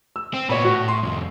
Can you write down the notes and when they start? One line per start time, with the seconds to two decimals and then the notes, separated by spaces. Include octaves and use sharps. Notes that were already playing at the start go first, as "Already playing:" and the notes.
0.16 E6
0.34 C4
0.49 A#2 B3 C#5 B5
0.65 A2 F#4
0.88 C6
1.03 C2 F2